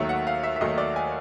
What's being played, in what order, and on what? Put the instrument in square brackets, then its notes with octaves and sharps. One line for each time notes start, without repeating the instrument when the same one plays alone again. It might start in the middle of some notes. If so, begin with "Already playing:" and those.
Already playing: [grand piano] D#2 D#3 F#3 A3 E5
F#5
F5
E5
E5
D#2 D#3 F#3 A3 D#5
D5
G#5